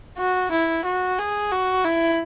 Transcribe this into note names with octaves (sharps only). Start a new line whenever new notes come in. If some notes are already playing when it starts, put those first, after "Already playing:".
F#4
E4
F#4
G#4
F#4
E4